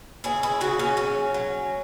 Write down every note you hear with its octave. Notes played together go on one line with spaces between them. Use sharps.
C#3 E4 G#4
E4 G#4
C#3 C#4 F#4
C#4 F#4
F#3 C#4
F#3